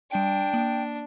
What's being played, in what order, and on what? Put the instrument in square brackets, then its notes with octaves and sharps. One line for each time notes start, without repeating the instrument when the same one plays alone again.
[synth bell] G3 D7 [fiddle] D4 [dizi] G5
[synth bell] A#3